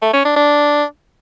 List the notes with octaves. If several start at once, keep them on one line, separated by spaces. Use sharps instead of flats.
A3
C#4
D4
D4